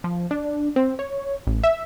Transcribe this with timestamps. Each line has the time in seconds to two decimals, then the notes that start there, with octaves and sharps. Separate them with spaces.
0.04 F3
0.31 D4
0.76 C4
0.99 C#5
1.47 A1
1.64 E5